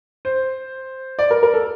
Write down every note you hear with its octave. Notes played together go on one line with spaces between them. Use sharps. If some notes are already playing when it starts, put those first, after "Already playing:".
C5
D5
A#4
A#4
A4